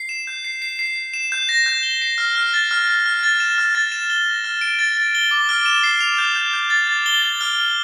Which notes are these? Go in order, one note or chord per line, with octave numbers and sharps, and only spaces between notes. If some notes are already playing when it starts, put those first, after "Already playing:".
Already playing: C7
E7
G6
C7
C7
C7
C7
E7
G6
A#6
G6
G7
C7
F6
F6
A6
F6
F6
F6
A6
E7
F6
A6
E7
G7
A#6
F6
D7
A6
A6
G7
D6
F6
E7
C7
F7
G6
G6
G6
A6
A6
G7
A6
F6
F6